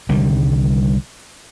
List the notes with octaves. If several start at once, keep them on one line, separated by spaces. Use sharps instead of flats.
C2 D3 D#3 G3